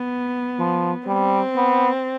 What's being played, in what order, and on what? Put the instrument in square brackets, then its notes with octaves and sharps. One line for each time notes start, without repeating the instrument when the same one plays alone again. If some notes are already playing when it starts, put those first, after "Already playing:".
Already playing: [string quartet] B3
[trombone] F3
[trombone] G3 [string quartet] C4
[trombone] B3